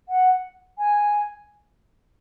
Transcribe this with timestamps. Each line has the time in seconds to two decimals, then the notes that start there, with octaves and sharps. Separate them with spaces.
0.09 F#5
0.78 G#5